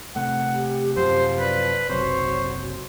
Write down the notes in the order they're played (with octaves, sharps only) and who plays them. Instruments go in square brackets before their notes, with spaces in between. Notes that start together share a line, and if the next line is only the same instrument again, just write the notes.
[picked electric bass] C3 A3 [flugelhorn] F#5
[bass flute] G4
[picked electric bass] F#2 C3 F#3 [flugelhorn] F3 [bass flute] G4 [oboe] C5
[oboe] B4 [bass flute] D5
[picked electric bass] F#1 B1 C3 [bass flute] F#3 [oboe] C5 [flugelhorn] C#5